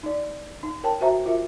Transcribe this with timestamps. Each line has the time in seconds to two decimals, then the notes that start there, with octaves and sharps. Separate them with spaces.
0.03 D#4 D5
0.63 D#4
0.84 A#4 C#5 G5 A5
1.01 F#4 C5 E5 A#5
1.26 F4 A#4 E5